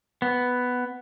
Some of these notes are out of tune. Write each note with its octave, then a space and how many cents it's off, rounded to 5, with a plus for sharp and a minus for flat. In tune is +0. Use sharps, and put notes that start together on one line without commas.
B3 +5